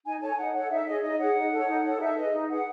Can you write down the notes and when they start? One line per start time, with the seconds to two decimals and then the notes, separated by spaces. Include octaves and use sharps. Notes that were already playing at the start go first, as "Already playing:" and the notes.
0.05 D#4 G#5
0.20 A4 C#5 A5
0.29 G#5
0.37 D#4 F#5
0.54 A4 C#5 F#5
0.69 D#4 E5
0.86 G#4 C#5 D#5
1.02 D#4 D#5
1.18 G#4 C#5 F#5
1.35 D#4
1.51 A4 C#5
1.67 D#4
1.83 A4 C#5
2.00 D#4 E5
2.17 G#4 B4 D#5
2.33 D#4
2.49 G#4 B4 F#5